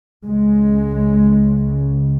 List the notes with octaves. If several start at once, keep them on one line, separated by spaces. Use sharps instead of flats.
C#2 C#3 G#3